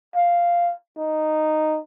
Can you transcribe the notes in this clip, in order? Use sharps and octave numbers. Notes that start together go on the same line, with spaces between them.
F5
D#4